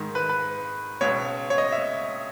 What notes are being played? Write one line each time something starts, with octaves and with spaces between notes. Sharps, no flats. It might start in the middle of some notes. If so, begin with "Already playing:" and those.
Already playing: G#2 D#3
B4
B4
C#2 B2 C#5
C#5
D#5
E5